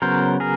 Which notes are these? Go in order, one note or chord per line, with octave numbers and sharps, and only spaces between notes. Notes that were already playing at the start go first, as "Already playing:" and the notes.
C#3 F#3 B3 A#4 C5
G#4 A#4